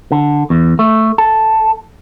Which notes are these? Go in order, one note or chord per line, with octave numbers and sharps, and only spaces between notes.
D3
E2
A3
A4